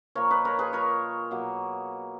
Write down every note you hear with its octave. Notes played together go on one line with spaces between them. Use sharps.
A#2 F3 A#3 A#4 C#5
B4 D#5
A#4 C#5
G#4 B4
A#4 C#5
B2 F#3 A#3